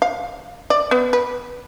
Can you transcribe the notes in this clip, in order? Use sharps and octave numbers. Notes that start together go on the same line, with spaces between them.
F5
D5
B3
B4